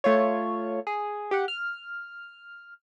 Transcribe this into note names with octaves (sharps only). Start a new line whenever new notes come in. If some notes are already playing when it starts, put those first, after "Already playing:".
A3 F4 C#5
G#4
G4 F#5
F6